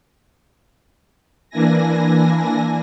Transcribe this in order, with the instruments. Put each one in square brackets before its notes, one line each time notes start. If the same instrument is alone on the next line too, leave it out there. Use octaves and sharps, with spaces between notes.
[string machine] E3 A#3 D4 E4 G#5 A#6